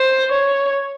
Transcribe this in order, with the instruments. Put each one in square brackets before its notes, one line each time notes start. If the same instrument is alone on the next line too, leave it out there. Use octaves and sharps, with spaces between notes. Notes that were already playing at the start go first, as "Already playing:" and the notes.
Already playing: [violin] C5
C#5